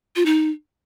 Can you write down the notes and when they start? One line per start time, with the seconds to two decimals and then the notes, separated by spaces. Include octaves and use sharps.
0.16 F4
0.26 D#4